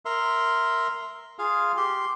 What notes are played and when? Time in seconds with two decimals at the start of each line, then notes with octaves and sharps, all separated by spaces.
0.05 A#4 E5 C6
1.39 F4 G#4 F5
1.77 G4 C6